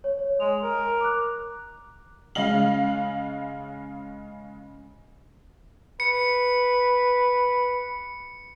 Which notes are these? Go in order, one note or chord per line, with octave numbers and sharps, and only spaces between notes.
C#5
C#5
G#3 F7
A#4
D6 F#6
C#3 G#3 F5 F#7
B4 C#7